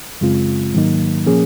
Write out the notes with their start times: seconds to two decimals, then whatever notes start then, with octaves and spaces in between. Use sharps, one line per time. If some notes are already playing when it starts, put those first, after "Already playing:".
0.21 F#2 C#3 G#3 C4 F4
0.75 G#2 D#3 F#3 A#3 D#4
1.26 A#2 F3 A#3 C#4 G#4